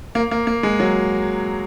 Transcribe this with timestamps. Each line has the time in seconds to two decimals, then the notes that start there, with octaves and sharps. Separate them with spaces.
0.15 A#3
0.31 A#3
0.47 A#3
0.63 G#3
0.80 F#3